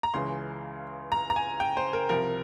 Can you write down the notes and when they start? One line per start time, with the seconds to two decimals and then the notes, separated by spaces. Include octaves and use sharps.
0.03 A#5
0.14 C#2 C#3 E3 G#3 C#4 C6
1.12 A#5
1.30 A#5
1.36 G#5
1.60 G5
1.77 C5
1.93 A#4
2.09 C2 C3 F3 A#4